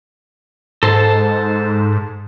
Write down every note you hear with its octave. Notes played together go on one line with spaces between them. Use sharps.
G#2 A4 C5 A5